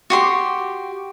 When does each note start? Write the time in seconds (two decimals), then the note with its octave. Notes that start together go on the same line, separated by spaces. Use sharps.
0.10 F#4 G4 C6